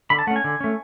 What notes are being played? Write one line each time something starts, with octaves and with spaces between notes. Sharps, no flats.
D3 B5
A5
A3 C#4 F#5
G#5
D3
A3 C#4